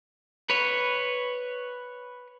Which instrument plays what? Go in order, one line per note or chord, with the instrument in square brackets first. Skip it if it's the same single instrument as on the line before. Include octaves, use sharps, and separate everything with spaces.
[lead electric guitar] B4 C#5